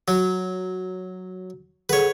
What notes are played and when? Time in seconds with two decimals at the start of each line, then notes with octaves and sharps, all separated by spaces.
0.08 F#3
1.89 G#4 A4 B4 C#5 F#5